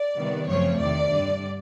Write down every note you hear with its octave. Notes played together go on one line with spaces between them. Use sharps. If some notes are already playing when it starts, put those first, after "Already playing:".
Already playing: D5
C3 D#3 G3 B3
F#2 C#3 F3 A3 C4 C#5
E2 C3 D#3 D5
G2 D3 G3